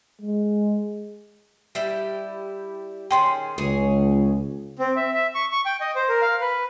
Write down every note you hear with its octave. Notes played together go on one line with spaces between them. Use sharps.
G#3
G3 E4 G4
D#3 C#4 G#4 G5 C6
C#2 G#4 C#5
C4
E5
E5
C#6
C#6
G5
D#5
C5
A#4
F5
B4